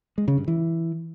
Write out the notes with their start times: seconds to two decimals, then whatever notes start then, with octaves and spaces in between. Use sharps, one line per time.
0.18 G#3
0.28 C#3
0.38 G2
0.48 E3